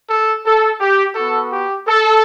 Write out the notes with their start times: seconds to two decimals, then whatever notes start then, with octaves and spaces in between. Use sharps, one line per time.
0.10 A4
0.45 A4
0.81 G4
1.15 B3 F#4 A4
1.52 G4
1.87 A4